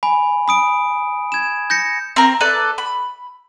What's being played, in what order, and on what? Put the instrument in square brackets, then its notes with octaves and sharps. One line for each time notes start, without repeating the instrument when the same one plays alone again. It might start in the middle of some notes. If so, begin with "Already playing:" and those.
[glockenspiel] G#5 B5
B5 D#6 D7
G#6 E7
G6 A#6 C#7
[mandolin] C4 A#4
A4 B4 D5
B5